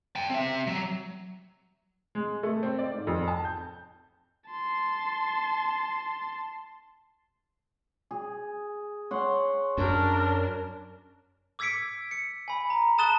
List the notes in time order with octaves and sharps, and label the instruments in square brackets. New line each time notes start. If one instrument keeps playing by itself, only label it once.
[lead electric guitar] G5 A5
C4 E5
F#3
[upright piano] G#3
A3
C4
D5
G#2
F2
A5
G6
[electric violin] A5 C6
[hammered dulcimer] G#4
C#5 F#5 C6
[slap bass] F#2 [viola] D4 A#4
[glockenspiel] D6 E6 G#6 B6 C#7 D7
C#7
G#5 B5
A#5
A5 D#6 F#6 A6 E7 G7